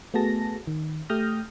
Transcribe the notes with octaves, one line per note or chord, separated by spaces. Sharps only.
A3 B3 F#4 G#4 A5 A#6
D#3
A3 G4 D#6 F6 G6 A#6